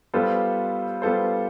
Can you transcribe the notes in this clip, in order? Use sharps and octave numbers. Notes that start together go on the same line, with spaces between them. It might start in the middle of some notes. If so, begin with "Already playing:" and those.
G3 B3 F4 A4 C5
G3 B3 F4 A4 C5